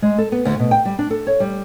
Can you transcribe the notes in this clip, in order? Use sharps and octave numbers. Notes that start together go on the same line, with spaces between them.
G#3
A4
B3
D2
B2
G5
G3
D4
A4
C#5
G3